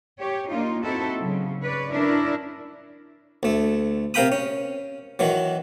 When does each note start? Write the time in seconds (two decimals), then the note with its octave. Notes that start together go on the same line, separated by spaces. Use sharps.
0.18 G4 C#5
0.50 A#3 D#4 F4
0.83 C4 D#4 E4 F#4 A4
1.18 C#3 F#3
1.62 B4 C#5 D5
1.91 C#4 D4 E4 A#4 D5
3.43 D2 A3
4.14 C3 A#4 F5 G5 B5 D#6
4.32 C#4
5.19 D#3 E3 F#3